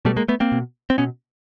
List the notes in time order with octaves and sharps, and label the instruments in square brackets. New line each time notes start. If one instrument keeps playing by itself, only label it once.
[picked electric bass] B2 G3 A3
G#3 A#3
A3 B3
A#3 C4
B2
C4
B2 B3 C#4